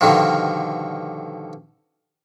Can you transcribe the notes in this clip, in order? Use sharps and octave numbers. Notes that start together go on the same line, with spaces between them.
G2 B2 D3 D#3 F3